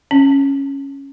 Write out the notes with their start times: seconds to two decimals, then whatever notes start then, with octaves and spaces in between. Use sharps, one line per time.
0.11 C#4